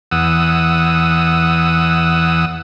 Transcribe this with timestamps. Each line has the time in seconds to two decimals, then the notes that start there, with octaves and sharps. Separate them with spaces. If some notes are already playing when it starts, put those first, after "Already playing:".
0.12 E2 F#5 D#6 E6